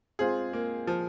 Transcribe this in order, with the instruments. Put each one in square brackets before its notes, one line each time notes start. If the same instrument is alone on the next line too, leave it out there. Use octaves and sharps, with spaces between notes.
[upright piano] G#3 C4 F4 C5 [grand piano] G#4
[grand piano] A#3
F3